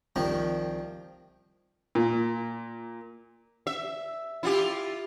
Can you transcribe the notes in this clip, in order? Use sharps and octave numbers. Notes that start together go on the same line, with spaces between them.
C2 D#3 F3
A#2
E5
E4 F4 G4